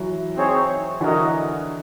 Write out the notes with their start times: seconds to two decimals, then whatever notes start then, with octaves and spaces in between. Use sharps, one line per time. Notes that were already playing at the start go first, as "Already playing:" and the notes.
Already playing: E3 F#3
0.36 C4 D#4 G#4 C#5
1.01 D3 E3 F#4 A#4 D#5